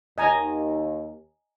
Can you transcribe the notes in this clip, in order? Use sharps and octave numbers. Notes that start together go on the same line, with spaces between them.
D#2 D#5 G#5 A#5